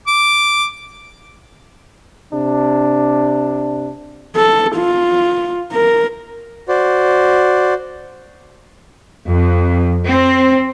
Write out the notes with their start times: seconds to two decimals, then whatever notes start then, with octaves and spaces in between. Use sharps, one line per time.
0.07 D6
2.32 C3 D4
4.36 A4
4.76 F4
5.73 A#4
6.68 F#4 C5 D5
9.26 F2
10.06 C4